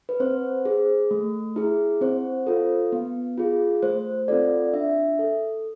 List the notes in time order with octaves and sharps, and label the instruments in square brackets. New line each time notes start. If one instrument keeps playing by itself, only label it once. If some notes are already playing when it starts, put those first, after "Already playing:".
[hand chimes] B4
C4 C5
G#4
A3
E4 G#4
C4 C5
F4 A4
B3
F4 G#4
A3 C5
C4 F4 A4 D5
D4 E5
A4